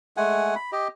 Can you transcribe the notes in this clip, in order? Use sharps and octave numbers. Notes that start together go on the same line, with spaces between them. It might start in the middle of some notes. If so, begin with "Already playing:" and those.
G#3 A3 F#5 G#5
B5
G4 D#5